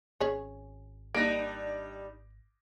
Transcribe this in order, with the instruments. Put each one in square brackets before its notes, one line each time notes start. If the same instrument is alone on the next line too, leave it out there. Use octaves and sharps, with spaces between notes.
[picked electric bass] G#1 [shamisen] C#4 G#4 C#5
[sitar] G3 D4 D#4 [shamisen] A#3 [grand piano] A#6 D7